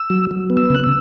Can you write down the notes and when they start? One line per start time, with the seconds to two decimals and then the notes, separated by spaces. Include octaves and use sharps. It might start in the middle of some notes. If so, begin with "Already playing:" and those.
Already playing: E6
0.10 F#3
0.31 F#3
0.50 B3
0.57 E6
0.70 C#3 F#6
0.84 E6